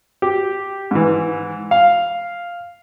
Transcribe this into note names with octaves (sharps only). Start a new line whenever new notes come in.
G4
G#2 E3
F5